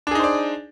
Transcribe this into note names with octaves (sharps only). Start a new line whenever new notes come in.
D4 D#4 G#4 C5 D5